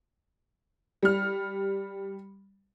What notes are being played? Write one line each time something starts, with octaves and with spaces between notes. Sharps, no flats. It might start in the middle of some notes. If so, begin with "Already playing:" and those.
G3 F6